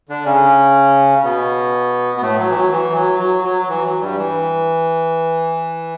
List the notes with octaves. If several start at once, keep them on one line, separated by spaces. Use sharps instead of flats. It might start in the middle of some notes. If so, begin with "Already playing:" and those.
D3 D4
C#3 C#4
B2 B3
B3
A2 A3
F#3
E3
F#3
E3
F#3
F#3
F#3
F#3
E3
F#3
G2 G3
E3